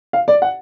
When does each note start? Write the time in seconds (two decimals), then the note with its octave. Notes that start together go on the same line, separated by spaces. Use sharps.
0.13 F5
0.28 D5
0.42 F#5